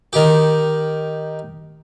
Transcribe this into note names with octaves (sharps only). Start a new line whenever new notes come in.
D#3 G4